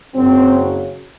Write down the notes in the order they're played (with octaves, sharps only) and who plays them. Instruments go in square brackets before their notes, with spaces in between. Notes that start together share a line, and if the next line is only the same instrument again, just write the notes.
[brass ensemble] F#1 F#2 C#3 F#3 C4